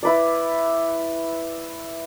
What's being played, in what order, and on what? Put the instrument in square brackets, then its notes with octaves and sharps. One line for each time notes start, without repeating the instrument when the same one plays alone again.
[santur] E4 B4 D5